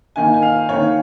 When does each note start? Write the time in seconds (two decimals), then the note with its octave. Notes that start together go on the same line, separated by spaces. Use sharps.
0.16 D#3 A#3 D#4 G#5
0.34 G#5
0.42 F5
0.69 D#3 A#3 D#4 C#5